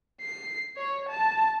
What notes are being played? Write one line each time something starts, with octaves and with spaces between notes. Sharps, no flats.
C7
C#5
A5